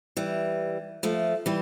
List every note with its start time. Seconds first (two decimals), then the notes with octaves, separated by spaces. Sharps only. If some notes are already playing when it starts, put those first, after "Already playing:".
0.17 E3 G3
1.03 F3 A3
1.46 E3 G3